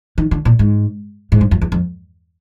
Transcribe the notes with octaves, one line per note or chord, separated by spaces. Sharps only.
D#3
D3
A#2
G#2
G#2
G2
F#2
E2
F2